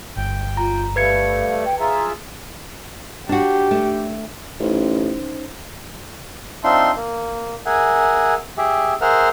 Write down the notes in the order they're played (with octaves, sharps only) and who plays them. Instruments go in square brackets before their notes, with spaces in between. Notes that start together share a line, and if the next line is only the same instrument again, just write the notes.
[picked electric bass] G1 [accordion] G5
[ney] F4 [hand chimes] A#5
[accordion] G3 A3 [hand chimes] B4 G#6 C#7 [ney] F5
[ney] G5
[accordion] F4 G#4 E5 [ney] A#5
[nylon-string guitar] D4 F#4 [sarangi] G4
[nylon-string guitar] A3 D4
[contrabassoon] A1 [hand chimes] C#4 D#4 C5
[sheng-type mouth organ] C4 D4 D#4 F4 E5 C6
A#3
G#4 A#4 E5 F#5 G#5
G4 G#4 E5
G#4 A#4 C5 E5 F#5 F6